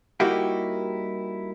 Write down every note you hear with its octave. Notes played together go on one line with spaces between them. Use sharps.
G3 A#3 D#4 E4 F#4 G4